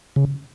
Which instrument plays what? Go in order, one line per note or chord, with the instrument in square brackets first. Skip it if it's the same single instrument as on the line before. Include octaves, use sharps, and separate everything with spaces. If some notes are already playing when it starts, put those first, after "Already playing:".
[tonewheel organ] C#3